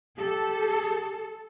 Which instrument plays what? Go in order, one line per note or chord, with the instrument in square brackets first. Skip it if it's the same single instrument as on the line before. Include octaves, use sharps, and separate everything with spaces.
[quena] G4 [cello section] A4